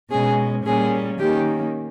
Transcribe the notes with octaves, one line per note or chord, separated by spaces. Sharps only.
B2 G#3 C#4 G#4
A#2 G3 A#3 C#4 G#4
D#3 A#3 C#4 G4